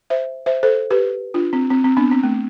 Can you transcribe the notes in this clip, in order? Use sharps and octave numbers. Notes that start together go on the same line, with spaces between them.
C5 E5
C5 E5
A4 C5
G4 B4
D4 F4
C4
C4
C4
B3 D4
C4
A3